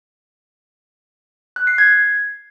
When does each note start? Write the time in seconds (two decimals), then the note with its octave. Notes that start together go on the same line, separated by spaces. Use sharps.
1.56 F#6
1.67 C7
1.78 G#6